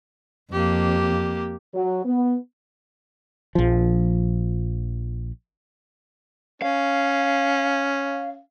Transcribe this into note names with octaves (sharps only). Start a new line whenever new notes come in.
F2 A#3 G4
F#3
B3
A#1 F3
C#4 F5